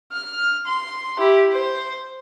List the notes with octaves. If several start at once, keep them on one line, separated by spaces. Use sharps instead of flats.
F6
C6
E4 G4
C5